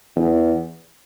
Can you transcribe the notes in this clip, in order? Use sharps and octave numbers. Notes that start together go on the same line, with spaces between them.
E2